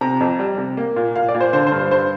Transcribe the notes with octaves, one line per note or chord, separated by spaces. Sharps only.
C3 A#5
F2
G3
C3
A#3
A#2
A#2 F5
D5
A#2
C5
D3 C5
C5
G2
C5
G2 C5